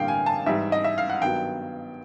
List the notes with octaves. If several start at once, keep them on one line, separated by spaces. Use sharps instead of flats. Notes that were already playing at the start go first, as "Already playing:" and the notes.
Already playing: A1 G2 D3 G3 A#3 F5 G5
G#5
A5
G#2 E3 G3 E5
D#5
E5
F5
F#5
G2 D#3 F#3 B3 G5